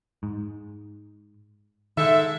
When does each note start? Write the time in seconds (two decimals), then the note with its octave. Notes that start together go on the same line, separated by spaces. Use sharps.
0.23 G#2
1.97 G#2 D#3 A4 E5